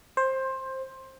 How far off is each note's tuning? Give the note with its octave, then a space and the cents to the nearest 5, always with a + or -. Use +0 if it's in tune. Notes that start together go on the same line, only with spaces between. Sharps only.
C5 +15